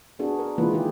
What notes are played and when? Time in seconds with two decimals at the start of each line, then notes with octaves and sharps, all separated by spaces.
0.19 B3 D4 F#4 G#4 A4
0.39 A#4
0.58 E3 G#3 A#3 E4 F4 B4
0.73 D#3 D#4 G4 G#4